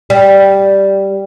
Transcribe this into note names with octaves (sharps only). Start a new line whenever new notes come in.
G3